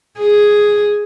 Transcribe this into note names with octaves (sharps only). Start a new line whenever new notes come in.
G#4